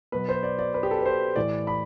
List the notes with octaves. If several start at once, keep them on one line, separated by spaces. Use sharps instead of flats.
B2 F#3 B4
C5
D5
D5
B4
G4
A4
B4
C5
A2 E3 D5
B5